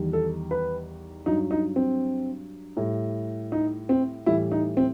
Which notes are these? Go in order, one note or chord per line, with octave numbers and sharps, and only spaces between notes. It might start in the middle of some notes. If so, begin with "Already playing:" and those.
Already playing: E2 D#3 G3
A4
B4
G2 F#3 D#4
D#4
C4
A2 G3
D#4
C4
A2 E3 G3 E4
D#4
C4